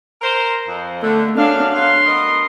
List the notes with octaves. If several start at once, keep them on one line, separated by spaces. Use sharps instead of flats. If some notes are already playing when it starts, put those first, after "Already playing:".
A#4 C5
F2
D3 A3
F#2 F#3 D4 F5
F#3 F5 C6
B3 A#4 D#5